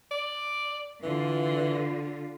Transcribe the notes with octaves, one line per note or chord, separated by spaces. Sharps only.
D5
D3 E3 F4